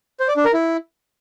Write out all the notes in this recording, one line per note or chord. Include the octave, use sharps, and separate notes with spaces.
C5
D5
D4
A#4
E4